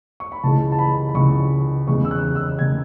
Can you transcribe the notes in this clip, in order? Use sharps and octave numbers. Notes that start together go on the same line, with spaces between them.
C#6
B5
C#2 C#3 E3 G#3 A5
A5
B5
B5
C#2 C#3 E3 G#3 C#6
E2 C#3 G#3 C#6
E6
F#6
E6
C#3 G#3 G#6